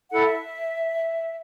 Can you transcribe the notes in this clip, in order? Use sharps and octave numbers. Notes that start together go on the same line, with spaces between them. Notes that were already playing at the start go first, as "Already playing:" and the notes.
E4 A4 F#5
E5